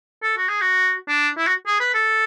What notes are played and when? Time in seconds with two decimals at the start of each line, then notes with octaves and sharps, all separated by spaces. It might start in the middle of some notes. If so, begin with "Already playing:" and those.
0.23 A4
0.37 F#4
0.48 G#4
0.61 F#4
1.08 D4
1.37 E4
1.47 F#4
1.66 G#4
1.80 B4
1.94 A4